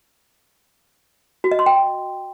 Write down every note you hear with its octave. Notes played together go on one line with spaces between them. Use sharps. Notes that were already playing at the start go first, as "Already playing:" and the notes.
F#4
D#5
C6
G5